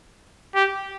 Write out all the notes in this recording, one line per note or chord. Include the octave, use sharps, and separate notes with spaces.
G4